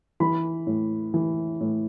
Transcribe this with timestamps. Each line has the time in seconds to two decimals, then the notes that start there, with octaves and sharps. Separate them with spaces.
0.20 E3 B5
0.67 A2
1.14 E3
1.61 A2